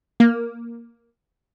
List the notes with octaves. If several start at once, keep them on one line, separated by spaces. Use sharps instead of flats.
A#3